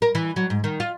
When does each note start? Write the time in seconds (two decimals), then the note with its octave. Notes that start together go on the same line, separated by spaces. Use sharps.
0.02 A#4
0.15 E3
0.36 F#3
0.50 G#2
0.64 D#3
0.80 F4